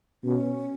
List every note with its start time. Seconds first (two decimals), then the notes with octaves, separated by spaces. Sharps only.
0.24 B2 C#4